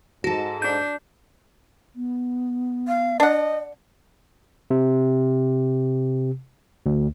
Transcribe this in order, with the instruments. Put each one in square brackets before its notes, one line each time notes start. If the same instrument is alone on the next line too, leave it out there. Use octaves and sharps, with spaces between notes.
[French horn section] G#2 [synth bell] F#4 [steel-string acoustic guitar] A4 A5
[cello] D4 [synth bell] G6
[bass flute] B3
[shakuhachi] F5
[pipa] D4 F#5 [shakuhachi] D#5
[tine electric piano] C3
D2